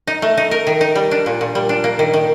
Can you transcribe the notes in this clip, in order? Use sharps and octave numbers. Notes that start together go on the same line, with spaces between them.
D#4
A3
D#4
A#4
D#3
D#4
G3
D4
A#2
A#2
G3
D4
A#3
D#3
D#3